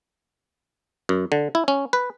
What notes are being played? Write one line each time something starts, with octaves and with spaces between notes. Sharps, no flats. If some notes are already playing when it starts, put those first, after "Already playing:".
F#2
D3
E4
C#4
B4